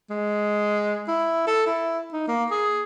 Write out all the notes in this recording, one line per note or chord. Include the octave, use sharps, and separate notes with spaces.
G#3
E4
A4
E4
D#4
A#3
G#4